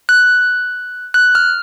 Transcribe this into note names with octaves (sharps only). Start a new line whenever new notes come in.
F#6
F#6
F6